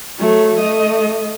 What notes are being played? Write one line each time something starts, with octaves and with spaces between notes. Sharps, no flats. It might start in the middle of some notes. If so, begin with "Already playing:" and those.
F#3 A3
A3 D#5